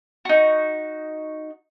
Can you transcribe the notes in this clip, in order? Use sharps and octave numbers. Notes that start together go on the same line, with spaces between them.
D#4 F#4